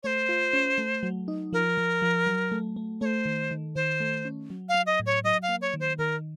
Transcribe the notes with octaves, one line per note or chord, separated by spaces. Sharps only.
A3 C5 C#5
F4
C#4
A3
F#3
D#4
F3 A#4
F3
F3
F#3
A3
A3
A3 C5 C#5
D#3
D#3
D#3 C5
A3
C#4
F#3
F5
F#3
D#5
A2
C#5
F#3 D#5
F5
A#3
C#5
D#3
C5
D#3 A#4